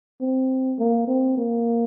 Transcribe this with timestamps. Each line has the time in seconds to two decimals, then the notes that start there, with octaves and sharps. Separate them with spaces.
0.21 C4
0.79 A#3
1.08 C4
1.37 A#3